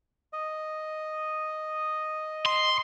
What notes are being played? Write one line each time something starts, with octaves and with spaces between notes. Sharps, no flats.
D#5
C6